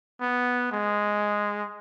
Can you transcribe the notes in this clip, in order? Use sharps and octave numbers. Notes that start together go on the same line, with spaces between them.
B3
G#3